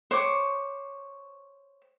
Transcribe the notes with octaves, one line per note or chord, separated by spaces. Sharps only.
C5 C#5 C#6 D6